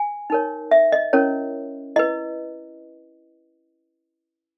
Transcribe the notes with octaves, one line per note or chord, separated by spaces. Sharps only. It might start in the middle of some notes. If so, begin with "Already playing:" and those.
Already playing: G#5
D#4 A#4 C#5
E5
D#5
C#4 E4 A#4 C#5
E4 B4 D#5